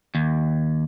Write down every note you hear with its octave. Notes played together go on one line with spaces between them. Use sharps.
D#2